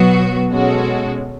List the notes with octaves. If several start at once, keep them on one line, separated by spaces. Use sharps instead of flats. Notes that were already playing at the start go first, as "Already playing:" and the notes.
Already playing: B2 F#3 B3 F#4
B2 G#3 C#4 F#4 A4